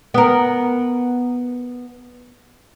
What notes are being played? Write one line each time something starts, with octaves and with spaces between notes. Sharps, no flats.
B3 A#4